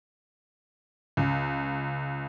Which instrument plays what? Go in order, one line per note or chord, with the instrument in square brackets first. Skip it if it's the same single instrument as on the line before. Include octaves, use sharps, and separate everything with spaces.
[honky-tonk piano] C#2